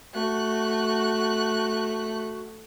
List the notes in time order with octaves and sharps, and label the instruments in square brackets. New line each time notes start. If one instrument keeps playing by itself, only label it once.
[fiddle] A3 F#6 [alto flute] F#4